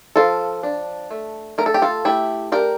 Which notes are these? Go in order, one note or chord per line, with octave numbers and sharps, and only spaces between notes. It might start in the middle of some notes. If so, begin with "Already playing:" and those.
F3 F4 A4
D4
A3
A3 A#4
A4
G4
F4 A4
A3 E4 G4
D4 G4 A#4